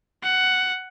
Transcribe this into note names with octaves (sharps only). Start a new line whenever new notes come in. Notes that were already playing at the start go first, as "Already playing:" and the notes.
F#5